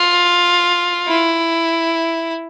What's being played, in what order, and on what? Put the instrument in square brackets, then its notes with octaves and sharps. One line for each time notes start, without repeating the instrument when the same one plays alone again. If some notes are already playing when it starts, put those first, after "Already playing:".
Already playing: [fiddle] F4
E4